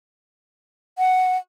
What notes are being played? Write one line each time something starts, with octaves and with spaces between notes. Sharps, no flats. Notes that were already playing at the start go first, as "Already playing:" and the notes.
F#5